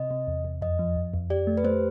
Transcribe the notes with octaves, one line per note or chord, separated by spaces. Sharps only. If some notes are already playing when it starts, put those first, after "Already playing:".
Already playing: C3 D#5
C3
E2
E2
F2 D#5
F3
F2
F2
G4 D5
A3
B4
A3 C5